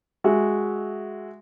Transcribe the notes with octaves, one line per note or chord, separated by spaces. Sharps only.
G#3 F#4 E5